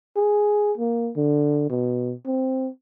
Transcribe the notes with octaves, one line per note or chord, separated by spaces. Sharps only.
G#4
A#3
D3
B2
C4